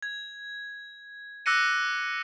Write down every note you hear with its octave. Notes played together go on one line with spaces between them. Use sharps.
G#6
D6 E6 F#6 A#6 C#7 D#7